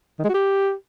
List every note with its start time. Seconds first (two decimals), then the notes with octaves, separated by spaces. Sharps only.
0.19 D#3
0.24 G#3
0.29 F#4
0.34 G4